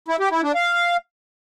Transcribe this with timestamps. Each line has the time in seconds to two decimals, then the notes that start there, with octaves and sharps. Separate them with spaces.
0.08 E4
0.20 G4
0.31 E4
0.43 D4
0.55 F5